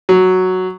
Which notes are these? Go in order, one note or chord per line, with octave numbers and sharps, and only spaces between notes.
F#3